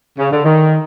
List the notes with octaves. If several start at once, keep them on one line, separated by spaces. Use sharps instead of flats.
C#3
D3
D#3